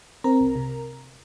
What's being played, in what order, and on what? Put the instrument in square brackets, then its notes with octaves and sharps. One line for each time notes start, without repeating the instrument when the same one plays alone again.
[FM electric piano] C4 A#4 A#5
C2
C3